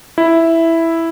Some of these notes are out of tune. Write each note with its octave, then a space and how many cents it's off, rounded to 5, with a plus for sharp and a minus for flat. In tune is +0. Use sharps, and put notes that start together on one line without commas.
E4 +0